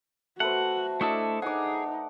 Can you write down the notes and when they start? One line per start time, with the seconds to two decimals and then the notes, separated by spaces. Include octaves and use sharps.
0.40 A3 F#4 B4 C5 F#5
1.01 A3 D4 E4 A4 D#5
1.42 D#4 G#4 F#5 D6